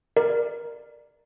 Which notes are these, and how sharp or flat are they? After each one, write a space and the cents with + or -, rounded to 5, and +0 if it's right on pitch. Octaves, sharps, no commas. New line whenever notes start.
A#4 +10 D5 +15